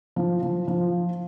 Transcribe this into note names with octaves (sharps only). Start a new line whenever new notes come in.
F3
F3
F3